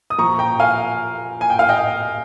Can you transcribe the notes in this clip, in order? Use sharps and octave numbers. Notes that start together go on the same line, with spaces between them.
D#6
A#2 F3 A#5 C#6
G5 A#5
F5 G#5
G#5
G5
F5
D#5 G5